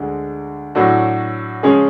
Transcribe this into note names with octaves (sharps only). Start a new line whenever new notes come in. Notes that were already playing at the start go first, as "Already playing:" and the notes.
Already playing: D2 D3 G#3
A2 F#3 A3 D4 F#4
C#3 F3 G#3 C#4 G#4